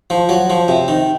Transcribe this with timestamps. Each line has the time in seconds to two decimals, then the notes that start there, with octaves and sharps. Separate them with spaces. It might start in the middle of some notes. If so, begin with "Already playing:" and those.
0.10 F3
0.29 F#3
0.50 F3
0.68 C3
0.88 D#3